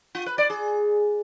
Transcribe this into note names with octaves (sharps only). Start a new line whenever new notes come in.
F4
B4
D5
G#4